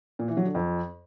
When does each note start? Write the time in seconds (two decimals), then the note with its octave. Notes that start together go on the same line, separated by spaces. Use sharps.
0.19 A#2
0.28 E3
0.37 F#3
0.46 D3
0.55 F2